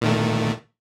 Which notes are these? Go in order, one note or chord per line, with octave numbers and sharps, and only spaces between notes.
A#2 D#3 A3